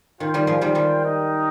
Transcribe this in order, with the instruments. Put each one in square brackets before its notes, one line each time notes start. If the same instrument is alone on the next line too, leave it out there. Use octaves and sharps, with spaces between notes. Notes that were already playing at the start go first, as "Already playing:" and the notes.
[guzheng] D#3 [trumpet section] F4 C5 G5
[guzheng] D#3 G3
F3 G#3
D#3 G3
D#3 G3
[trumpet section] D#4 A#4 D#5 G5